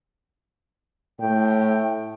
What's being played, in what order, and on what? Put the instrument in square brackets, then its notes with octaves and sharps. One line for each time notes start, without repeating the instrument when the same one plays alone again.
[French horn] A2 [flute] G5